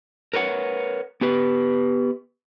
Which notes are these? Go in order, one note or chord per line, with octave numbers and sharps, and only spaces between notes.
A#4 B4 C#5 F#5
B3 G4 B4